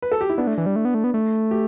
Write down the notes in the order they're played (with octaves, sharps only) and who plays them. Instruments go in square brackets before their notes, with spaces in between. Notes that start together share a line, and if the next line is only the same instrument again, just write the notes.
[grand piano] B4
A4
G4
E4
[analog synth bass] B3 [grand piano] D4
[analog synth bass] A3
E3
G3
A3
B3
A3
B3
A3
[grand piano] G4